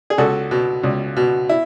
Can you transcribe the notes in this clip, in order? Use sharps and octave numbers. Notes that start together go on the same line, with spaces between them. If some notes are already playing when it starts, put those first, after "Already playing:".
G#4
C#2 F#4 A4
B2
C#2
B2
E4